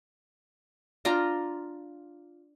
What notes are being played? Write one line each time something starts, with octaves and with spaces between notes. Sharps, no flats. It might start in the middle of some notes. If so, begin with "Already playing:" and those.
D4 F4 G5 A#5